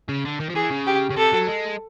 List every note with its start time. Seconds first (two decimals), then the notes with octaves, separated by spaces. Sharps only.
0.09 C#3
0.25 D3
0.40 D#3
0.50 F3
0.55 E3 G#4
0.71 C#3
0.87 G4
1.10 C#3
1.16 C3 A4
1.33 F#3
1.47 G#3